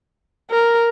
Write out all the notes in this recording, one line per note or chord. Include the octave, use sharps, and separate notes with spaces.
A#4